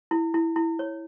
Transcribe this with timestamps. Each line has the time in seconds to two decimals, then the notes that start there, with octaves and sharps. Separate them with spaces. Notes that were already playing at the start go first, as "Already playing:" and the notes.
0.11 E4
0.34 E4
0.56 E4
0.79 C#5